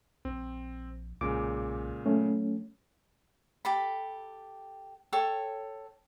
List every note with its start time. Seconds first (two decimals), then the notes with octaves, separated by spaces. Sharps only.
0.25 A#1 C4
1.21 B1 A#2 C#3 G#3 D6
2.06 F#3 A3 C#4
3.65 G4 A4 B5
5.13 A4 C#5 G5